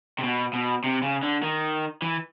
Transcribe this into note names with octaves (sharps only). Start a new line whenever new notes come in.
C3
B2
B2
C3
C#3
D3
D#3
E3